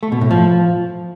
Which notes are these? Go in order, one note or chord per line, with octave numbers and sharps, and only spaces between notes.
A3
B2
A2
F3